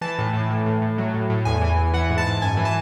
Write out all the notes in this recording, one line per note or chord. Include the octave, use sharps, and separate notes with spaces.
E3 A5
A2
A2
E3
A2
A2
F#3
A2
A2
E2 G#5
E3
E2
E3 F#5
G#2
A5
G#2
F#2 G#5
E3
A5